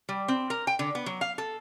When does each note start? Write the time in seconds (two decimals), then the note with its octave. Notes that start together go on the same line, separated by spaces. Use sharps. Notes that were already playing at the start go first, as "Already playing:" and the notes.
0.09 G3
0.28 C4
0.50 A#4
0.67 G5
0.79 D3
0.95 B3
1.06 F#3
1.21 F5
1.38 A4